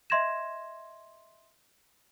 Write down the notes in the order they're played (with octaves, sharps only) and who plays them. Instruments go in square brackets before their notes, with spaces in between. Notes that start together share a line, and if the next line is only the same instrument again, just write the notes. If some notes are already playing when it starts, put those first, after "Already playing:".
[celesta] D#5 E5 C6 G#6 A#6 E7